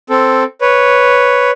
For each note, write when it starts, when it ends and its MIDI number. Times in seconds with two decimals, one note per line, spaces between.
0.10 0.44 60
0.10 0.44 69
0.61 1.51 71
0.61 1.51 73